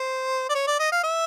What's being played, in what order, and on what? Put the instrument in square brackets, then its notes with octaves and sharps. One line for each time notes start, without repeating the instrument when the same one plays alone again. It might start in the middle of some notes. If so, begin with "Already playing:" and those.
Already playing: [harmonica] C5
D5
C#5
D5
D#5
F5
E5